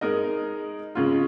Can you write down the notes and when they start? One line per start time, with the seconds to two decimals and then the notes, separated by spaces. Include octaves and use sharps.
0.01 G#3 D#4 A#4 D#5
0.95 C#3 G#3 C#4 F4